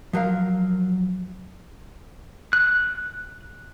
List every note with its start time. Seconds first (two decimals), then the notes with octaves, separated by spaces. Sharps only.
0.13 F3 F#3 A#4 F5
2.53 F#6